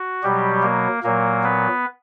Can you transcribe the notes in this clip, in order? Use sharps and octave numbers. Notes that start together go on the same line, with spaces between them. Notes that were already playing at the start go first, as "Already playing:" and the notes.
Already playing: F#4
B2 F#3 G3 G4
A#3 A#4
A#2 F#3 A#3 A#4
B3 B4